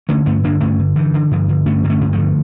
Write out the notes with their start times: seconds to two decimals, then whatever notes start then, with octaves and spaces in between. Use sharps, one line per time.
0.09 D3 A3 C#4
0.26 G2 A3 C#4
0.44 D3 A#3 D4
0.61 G2 A3 C#4
0.79 D3
0.96 G2 E3
1.14 D3
1.31 G2 D3 F3
1.49 D3
1.66 G2 A3 C#4
1.84 D3
1.90 A3 C#4
2.01 G2
2.13 F3 A3
2.19 D3